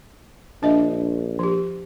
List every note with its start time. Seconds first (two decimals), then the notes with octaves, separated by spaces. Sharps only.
0.63 A#1 D4 D#5 E5
1.39 F3 G4